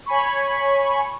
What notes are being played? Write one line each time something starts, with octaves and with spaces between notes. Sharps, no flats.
C#5 G#5 B5 C#6